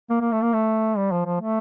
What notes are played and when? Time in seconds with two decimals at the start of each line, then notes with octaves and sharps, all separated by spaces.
0.10 A#3
0.21 A#3
0.32 A3
0.42 A#3
0.54 A3
0.97 G3
1.12 F3
1.25 F3
1.40 A3